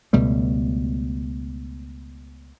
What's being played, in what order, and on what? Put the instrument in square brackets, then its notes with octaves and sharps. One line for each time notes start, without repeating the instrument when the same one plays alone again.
[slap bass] C#2 B2 G3 A3